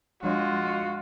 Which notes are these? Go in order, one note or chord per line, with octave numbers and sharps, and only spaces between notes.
F3 G#3 D4 F4 F#4 C#5